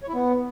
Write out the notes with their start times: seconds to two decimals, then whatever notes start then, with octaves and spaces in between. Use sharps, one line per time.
0.03 C#5
0.09 E4
0.14 B3